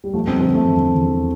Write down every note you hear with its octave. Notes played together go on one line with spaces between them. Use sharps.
G3
F3 A3
C4
D3 C4
A3
E2
E2